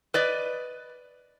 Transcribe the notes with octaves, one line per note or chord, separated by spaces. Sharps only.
B4 D5 D#5